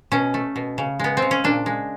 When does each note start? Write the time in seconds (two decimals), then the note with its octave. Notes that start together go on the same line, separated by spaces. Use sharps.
0.12 B2 C#4
0.34 A3
0.56 B2
0.78 C#3
1.00 G#3 B3
1.17 C4
1.22 C#3
1.31 C#4
1.44 A#2 D4
1.66 G#3